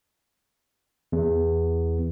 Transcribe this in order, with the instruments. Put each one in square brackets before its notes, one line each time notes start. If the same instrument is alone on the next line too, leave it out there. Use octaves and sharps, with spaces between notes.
[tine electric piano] E2